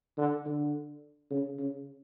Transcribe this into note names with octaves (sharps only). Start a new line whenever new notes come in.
D3
D3
C#3
C#3